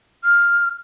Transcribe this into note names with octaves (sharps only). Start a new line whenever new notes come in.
F6